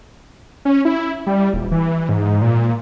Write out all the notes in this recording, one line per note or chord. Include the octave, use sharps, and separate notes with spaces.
C#4
E4
G3
D#1
E3
G#2
A#2